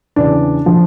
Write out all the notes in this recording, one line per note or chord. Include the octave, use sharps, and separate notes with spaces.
E2 C#3 E3 D4
D3 F3